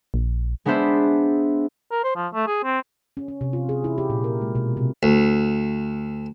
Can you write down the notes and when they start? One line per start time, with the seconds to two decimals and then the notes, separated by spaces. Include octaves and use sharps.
0.14 A#1
0.65 G#3 B3 D4 B4 C5 E5
1.92 A#4
2.04 C5
2.16 F3
2.34 A3
2.47 G#4
2.64 C4
3.17 C#4
3.28 C#4
3.41 C3
3.53 F4
3.69 G#4
3.84 E4
3.98 G4
4.10 A#2
4.24 A#4
4.42 G#3
4.55 B2
4.77 C3
5.03 D2